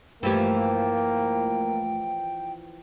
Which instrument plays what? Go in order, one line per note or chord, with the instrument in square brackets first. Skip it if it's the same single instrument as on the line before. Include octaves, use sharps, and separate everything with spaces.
[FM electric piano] G2 A3 [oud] E3 F3 G4 [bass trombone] A#3 [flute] G5